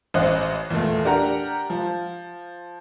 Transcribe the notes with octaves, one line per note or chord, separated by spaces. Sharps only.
A1 C5 D#5 F#5 F#6
E2 A#2 A3
D4 G4 A#4 F#5 A#5
F3